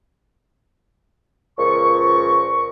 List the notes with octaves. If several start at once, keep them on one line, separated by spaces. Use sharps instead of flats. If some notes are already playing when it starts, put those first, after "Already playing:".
C#2 A#2 F3 C#6